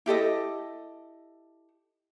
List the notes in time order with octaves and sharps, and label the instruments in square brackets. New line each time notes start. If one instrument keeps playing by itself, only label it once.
[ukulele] E4 G4 A4 D#5